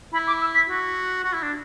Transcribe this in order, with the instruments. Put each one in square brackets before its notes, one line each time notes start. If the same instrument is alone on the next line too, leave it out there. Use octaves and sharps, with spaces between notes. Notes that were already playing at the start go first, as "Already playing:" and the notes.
[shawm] E4 [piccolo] B5
[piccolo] D6
E6
B6
[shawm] F#4
F#4
E4
D4